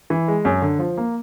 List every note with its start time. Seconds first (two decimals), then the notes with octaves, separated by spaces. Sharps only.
0.10 E3
0.28 G#3
0.45 F#2
0.62 D3
0.79 F3
0.97 A#3